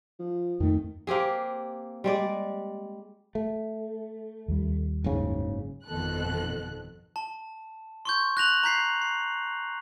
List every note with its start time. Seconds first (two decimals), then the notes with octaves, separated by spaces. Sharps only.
0.19 F3
0.60 F2 D#3 A3
1.07 A#3 C4 G4 G#4
2.04 G3 G#3 D5
3.35 A3
4.48 D#2 G3
5.04 F#1 G#2 C#3
5.86 G1 F2 B2 D#3 A4 F#6
7.16 A5
8.05 C6 C#6 G6
8.37 F#6 A#6 F7 F#7
8.63 A#5 G6 B6 C7
9.02 C7